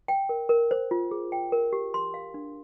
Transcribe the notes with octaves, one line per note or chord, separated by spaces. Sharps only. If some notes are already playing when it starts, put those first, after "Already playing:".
G5
A#4
A#4
C5
F4
G#4
G5
A#4
G4
C6
F5
D4